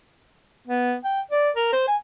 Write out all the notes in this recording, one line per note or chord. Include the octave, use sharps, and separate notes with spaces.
B3
G5
D5
A#4
C5
G#5